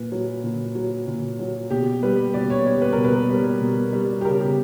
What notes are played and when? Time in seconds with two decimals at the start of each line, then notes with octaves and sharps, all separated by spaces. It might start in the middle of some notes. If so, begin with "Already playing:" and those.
Already playing: A#2 B4
0.12 F#3
0.44 A#2
0.75 F#3
1.08 A#2
1.39 F#3
1.70 B2 G4
2.03 G3 B4
2.34 B2 D5
2.50 C#5
2.66 G3 C#5
2.82 B4
2.93 B2 A#4
3.04 B4
3.30 G3
3.61 B2
3.92 G3
4.21 G4
4.25 C#3 A#4
4.40 G4